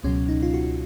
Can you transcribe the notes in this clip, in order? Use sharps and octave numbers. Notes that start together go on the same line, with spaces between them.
C#2 B2 F#3 C#4
D#4
F4
F#4